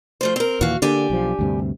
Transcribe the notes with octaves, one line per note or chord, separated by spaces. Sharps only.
F3 A3 C5
C4 A#4
D#2 A#2 E3 F#4 F5
D3 A#3 D4 G4 G#5
B1 F3
D2 G2 C3